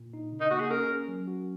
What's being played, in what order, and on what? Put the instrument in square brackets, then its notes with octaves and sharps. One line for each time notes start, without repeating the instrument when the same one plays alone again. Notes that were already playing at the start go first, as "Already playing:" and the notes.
Already playing: [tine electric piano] A#2
D#4
C#3
[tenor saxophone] D#4
[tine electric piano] A#3 [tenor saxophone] F#4
[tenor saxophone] G#4
[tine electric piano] C#4 [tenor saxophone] A#4
[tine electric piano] C#4
F#3
F#4